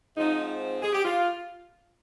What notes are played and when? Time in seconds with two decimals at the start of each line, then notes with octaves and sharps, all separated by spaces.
0.17 G#2 F3 C4 D#4
0.82 G#4
0.93 G4
1.04 F4